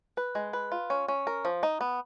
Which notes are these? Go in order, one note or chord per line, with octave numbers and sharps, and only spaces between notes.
B4
G#3
B4
F4
C#4
C#4
A#4
F3
D#4
B3